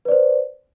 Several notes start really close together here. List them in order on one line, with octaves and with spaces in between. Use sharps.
B4 D5 C5